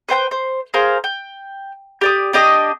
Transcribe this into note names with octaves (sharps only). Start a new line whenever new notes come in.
B4 C5 G5 G6
C5
G#4 A#4 C5 F5
G5
G4 D5 D#6
D4 G4 D#5 D#6